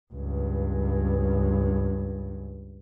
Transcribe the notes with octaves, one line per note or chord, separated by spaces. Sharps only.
C#2 G2